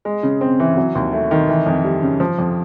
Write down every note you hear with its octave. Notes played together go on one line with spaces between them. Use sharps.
G#3
C#3
C4
E3
F#3
D#2
A3
D#3
E3
F2
G3
C#3
F3
F2